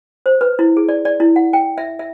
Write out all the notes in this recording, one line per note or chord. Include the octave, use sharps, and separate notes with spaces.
C5
B4
E4
G#4
D5
D5
E4
F#5
G5
E5
E5